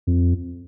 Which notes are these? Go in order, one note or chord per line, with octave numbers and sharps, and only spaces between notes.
F2